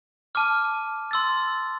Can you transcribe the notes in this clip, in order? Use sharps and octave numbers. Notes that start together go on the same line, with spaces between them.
A5 D6 F6
C6 E6 A6